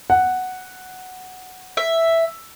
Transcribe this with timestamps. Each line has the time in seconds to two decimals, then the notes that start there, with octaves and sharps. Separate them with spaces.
0.10 F#5
1.77 E5